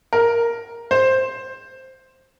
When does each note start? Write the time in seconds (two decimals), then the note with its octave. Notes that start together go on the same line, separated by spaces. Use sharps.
0.13 A#4
0.91 C5